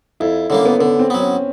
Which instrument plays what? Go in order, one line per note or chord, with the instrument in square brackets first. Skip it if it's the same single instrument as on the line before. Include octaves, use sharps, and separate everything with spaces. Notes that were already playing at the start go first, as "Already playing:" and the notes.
[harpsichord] F2 [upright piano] E4
[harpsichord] D3 G3 A#3 [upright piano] C#4
[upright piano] B3
[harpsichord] D3 [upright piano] B3
[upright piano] C4
[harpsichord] F#3 B3
[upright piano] C#4